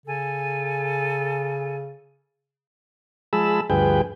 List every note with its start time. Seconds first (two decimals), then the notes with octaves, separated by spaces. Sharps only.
0.06 C#3 A4 G#5
3.33 F3 G#3 G#4 A5 B5 E6
3.70 D2 G2 F3 G#4 B4 G5